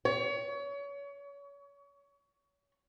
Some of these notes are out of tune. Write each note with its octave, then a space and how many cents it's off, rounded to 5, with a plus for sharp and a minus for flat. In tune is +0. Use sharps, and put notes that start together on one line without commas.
C#5 +30